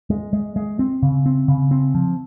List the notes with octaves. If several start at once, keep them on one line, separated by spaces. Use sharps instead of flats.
G#3
G#3
G#3
C4
C#3
C4
C#3
C4
F3